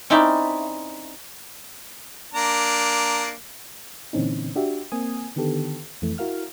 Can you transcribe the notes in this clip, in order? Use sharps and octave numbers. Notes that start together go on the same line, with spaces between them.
C4 C#4 D#4 E4 D5 E5
A#3 D4 A#5
A#2 D3 E3 C4 C#4 D#4
D4 F#4 G4 E5
A#3 C4 G#5 D#6
D3 D#3 B3 G4 A4
F2 E3 A3
E4 F#4 A#4 F5 F6